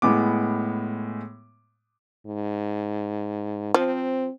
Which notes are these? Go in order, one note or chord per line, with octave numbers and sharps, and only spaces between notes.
A2 G#3 B3 D6
G#2
F3 C4